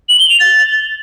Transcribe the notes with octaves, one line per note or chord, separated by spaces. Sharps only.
F#7
G7
F7
A6